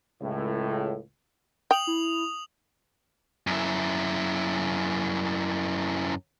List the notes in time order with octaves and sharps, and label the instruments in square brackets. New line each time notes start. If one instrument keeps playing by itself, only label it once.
[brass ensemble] C#2 A2
[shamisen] G5 [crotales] D#6 F7 F#7
[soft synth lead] E4
[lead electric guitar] F#2 E4